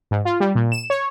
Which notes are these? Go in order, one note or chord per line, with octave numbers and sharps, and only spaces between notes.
G#2
F4
G3
A#2
E7
C#5